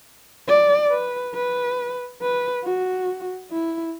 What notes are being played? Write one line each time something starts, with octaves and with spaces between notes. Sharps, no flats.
D5
B4
B4
B4
F#4
E4